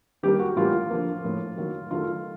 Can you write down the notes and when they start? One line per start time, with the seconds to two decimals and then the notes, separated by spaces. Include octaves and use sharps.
0.23 D#3 G3 A#3 G4
0.39 F#4
0.56 A2 E3 G3 A#3 F4
0.90 D3 F3 A#3
1.24 A2 F3 A#3
1.57 D#3 F#3 A#3
1.91 D#3 F#3 A3 F4